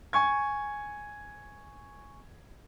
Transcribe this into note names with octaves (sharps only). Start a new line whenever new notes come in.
G#5 C#6 G#6